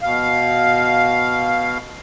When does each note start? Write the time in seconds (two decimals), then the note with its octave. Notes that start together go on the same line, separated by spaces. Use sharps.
0.02 B2 F5